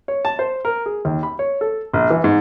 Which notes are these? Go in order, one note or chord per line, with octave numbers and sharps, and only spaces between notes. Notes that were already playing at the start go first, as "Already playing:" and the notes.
C#5
A5
C5
A#4
G#4
D#2
B5
C#5
A4
A#1
E3
G#2